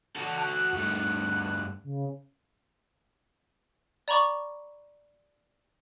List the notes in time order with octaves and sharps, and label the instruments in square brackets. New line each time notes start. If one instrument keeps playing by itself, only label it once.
[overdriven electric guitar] F#4 A4 [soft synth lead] A5
[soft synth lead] F#6
[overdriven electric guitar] G2 A3
[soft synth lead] C#3
[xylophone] D5 A#5 B5 C#6 D6